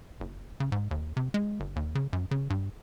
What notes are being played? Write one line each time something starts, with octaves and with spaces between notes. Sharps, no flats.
F#1
C#3
G#2
D#2
C3
G#3
G1
D#2
C#3
F#2
C#3
G2